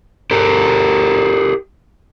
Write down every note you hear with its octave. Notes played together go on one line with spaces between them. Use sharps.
G4 A4 A#4